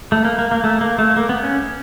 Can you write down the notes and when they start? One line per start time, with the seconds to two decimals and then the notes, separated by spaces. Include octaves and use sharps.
0.12 A3
0.25 A#3
0.39 A#3
0.51 A#3
0.64 A3
0.81 A#3
0.99 A3
1.17 A#3
1.29 B3
1.43 C#4